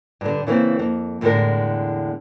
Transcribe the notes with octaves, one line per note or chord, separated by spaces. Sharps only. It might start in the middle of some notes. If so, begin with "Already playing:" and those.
G2 D3
C#3 E3 A#3 C4
F2 A#3
E2 A2 D3 F3 G#3 A#4